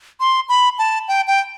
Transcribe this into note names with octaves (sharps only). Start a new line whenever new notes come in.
C6
B5
A5
G5
G5